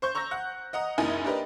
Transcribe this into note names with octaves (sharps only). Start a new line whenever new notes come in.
C5 C#6 G6
A#5 C#6 E6 G6 A#6
F#5 F#6
D#5 F#5 A#5 D#6
F#1 C2 D#4 E4 G#5 D#6
D4 G4 A#4 B4 D#5